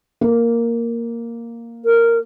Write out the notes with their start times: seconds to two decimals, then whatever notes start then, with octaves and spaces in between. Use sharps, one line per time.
0.21 A#3
1.85 A#4